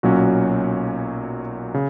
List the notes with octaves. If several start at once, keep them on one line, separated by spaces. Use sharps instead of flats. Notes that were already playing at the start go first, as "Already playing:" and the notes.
B1 A#2 F#3 C#4 F#4
C#3